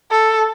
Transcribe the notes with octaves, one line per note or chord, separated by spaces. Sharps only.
A4